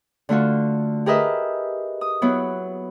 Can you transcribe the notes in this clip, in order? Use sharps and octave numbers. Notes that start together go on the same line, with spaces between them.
D3 A3 F4 F#4
G4 G#4 A#4 B4 D#5 E5
D#6
F#3 B3 E4